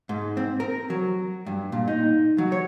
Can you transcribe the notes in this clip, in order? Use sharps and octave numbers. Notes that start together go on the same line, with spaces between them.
G#2
C4
A#4
F#3
G2
A#2
D#4
F#3
C#5